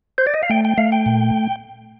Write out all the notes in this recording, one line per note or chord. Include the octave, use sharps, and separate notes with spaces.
C5
D5
D#5
F5
A3 G5
G5
A3 F5
G5
A#2